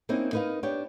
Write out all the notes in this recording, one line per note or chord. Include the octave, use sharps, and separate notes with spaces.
A#3 C4 C#4 D#4 E4
D#4 A#4 B4 D#5 F5
D4 G4 C#5 G5